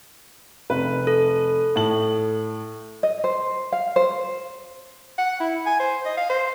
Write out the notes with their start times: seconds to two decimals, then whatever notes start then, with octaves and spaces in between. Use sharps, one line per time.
0.70 F1 B4
1.07 A4
1.75 A2 A5 F#7
3.03 D#5
3.24 C5
3.72 F5
3.96 C5
5.18 F#5
5.40 E4
5.66 G#5
5.80 C5
6.05 D#5
6.17 F5
6.30 C5